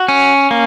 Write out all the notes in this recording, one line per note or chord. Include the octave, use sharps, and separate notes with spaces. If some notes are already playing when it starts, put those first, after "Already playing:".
Already playing: F#4
C#4
A#3